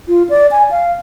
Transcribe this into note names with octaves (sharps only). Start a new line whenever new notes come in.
F4
D5
G#5
F5